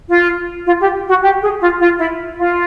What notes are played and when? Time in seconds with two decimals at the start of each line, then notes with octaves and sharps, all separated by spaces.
0.09 F4
0.66 F4
0.80 G4
1.09 F#4
1.22 G4
1.42 G#4
1.60 F4
1.80 F4
1.99 E4
2.38 F4